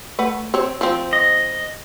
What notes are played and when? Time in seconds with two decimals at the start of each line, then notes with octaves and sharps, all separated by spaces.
0.19 A3 B4 F#5
0.54 C4 C#5
0.81 F3 C4
1.13 D#5